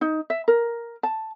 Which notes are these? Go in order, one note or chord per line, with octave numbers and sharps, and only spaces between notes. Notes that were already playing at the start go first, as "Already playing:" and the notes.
D#4
E5
A#4
A5